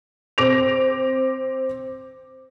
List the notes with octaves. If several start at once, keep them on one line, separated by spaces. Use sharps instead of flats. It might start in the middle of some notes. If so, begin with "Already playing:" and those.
C4 D6 A#6 D7 F7